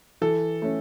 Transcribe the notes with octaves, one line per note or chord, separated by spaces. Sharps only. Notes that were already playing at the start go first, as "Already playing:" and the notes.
E3 A4
A3 C#4